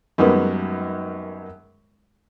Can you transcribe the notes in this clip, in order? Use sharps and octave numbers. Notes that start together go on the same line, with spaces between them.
F#2 D#3 G3 G#3 A#3 B3